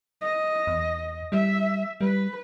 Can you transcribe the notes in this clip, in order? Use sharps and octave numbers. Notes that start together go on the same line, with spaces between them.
D#5
E2
G3 E5
G3 B4